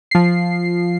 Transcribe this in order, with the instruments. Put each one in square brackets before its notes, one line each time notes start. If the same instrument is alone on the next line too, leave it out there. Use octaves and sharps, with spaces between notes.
[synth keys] F3 C7